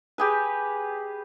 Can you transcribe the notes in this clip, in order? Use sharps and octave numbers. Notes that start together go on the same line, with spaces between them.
G4 G#4 B4